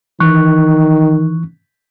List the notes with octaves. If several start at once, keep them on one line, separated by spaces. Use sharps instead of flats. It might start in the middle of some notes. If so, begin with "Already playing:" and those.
D#3 E3 C#6 F#6